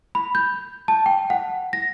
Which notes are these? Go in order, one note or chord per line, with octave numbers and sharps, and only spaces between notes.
B5
G6
A5
G5
F#5
A#6